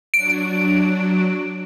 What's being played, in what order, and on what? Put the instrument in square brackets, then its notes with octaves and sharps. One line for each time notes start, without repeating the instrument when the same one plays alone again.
[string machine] F#3 D4 F#4 [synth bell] D7